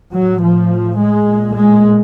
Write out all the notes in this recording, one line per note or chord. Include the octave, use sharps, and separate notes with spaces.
A2 F#3
F3
G#3
A#2
G#3